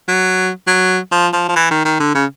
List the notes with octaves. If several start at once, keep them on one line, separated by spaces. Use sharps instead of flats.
F#3
F#3
F3
F3
F3
E3
D#3
D#3
D3
C#3